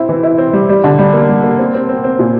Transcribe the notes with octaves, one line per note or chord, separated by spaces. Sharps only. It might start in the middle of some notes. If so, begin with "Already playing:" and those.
Already playing: C4 E4
E3
E4
C4
G3
G3
D3
G3
A#3
G3
A#3
C4
C4
C4
C4
A#2